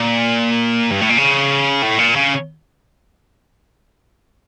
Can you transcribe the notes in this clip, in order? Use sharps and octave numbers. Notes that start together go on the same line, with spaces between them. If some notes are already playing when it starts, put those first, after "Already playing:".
Already playing: A#2
G2
A2
A#2
C#3
A2
A#2
C#3